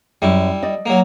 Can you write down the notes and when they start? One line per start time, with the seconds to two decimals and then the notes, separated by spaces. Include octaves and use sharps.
0.22 F#2 G3 E4
0.62 D5 D#5
0.86 F#3 A#3